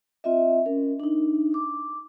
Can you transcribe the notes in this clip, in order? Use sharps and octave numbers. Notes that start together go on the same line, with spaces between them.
C4 F4 D#5 E5
C#4 A#4
D4 D#4
D6